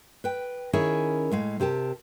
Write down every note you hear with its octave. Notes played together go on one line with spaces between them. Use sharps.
B4 G5
D#3 C#4 E4 G#4 A#4 C#5
A2 G#3 F5
C3 G4 A#4 A5